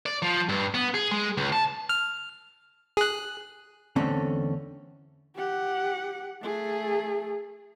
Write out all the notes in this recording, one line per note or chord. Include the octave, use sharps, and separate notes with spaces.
D5
F3
G2
B3
G#4
G#3
C#2
A5
F6
G#4 F#6
E2 D3 A3 C4 C#4
G4 F#5
A3 G#4